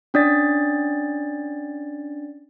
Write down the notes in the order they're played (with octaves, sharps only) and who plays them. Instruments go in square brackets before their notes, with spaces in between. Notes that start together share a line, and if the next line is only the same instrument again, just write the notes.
[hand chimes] C#4 D4 D5 A6